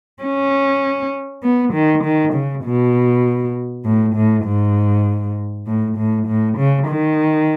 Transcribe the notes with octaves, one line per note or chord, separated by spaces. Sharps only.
C#4
B3
D#3
D#3
C#3
B2
A2
A2
G#2
A2
A2
A2
C#3
D#3